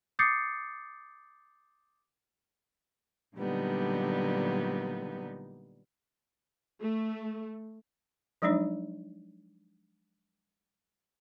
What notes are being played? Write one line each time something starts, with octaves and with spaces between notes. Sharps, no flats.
D6 D#6 G6 A6 C7 C#7
A#2 D3 F#3 G3 B3 D#4
A3
F3 F#3 G#3 D4 D#4 C#5